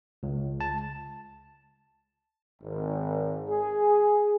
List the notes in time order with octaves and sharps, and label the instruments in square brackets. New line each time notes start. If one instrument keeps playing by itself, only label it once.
[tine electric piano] C#2
A5
[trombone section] G#1
G#4